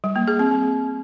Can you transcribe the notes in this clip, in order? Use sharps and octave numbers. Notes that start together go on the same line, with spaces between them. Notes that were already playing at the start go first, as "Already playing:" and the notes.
G3
A#3
G#4
C4
C4